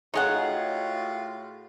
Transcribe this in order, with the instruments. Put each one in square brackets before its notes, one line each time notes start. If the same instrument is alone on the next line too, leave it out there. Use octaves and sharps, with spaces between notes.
[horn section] A2 F4 F#4 [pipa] D#4 D#5 F#5 [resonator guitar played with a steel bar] G#4 C#5